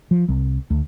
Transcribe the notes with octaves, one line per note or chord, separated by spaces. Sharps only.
F3
C2
D2